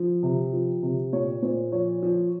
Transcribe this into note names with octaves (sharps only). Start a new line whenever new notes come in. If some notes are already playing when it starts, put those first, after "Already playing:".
Already playing: F3
C3
F3
C3
A#2 C#5
A#2 C5
F3 C#5
F3